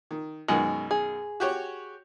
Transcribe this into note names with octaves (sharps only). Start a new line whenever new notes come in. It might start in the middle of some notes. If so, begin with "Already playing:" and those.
D#3
F#2 B2 D#3 G#3
G#4
F#4 G4 C#5